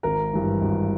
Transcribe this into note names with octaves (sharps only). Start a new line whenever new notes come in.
G#1 A#4
G2 E3
G#1